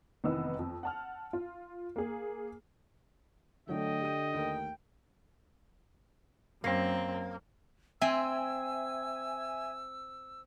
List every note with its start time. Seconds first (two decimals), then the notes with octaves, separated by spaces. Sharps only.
0.24 F1 D#3 E3 B3 D#5 E6
0.59 F2
0.83 F#5 A5 F6
1.33 F4
1.96 A#3 G#4
3.69 D3 F#3 A3 D#5 G5
4.01 G4 D#7
4.34 D#2 A3 A#4 G5
6.64 F#2 A#3 C4
8.02 C4 E5 G#5 E6